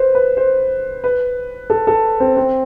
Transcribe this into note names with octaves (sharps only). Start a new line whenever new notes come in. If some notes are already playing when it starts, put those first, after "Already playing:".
Already playing: B4 C5
B4
C5
B4
A4
A4
C4
C4